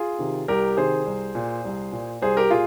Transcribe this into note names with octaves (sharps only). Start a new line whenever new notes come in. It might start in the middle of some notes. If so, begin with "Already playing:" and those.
Already playing: F4 G#4
C3 D#3
C2 G4 A#4
C3 D#3 G#4 C5
C2
A#2
C2
A#2
C2 G#4 C5
G4 A#4
A#2 F4 G#4